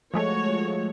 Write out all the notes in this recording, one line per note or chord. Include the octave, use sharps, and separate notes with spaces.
F3 G#3 A3 F#4 C#5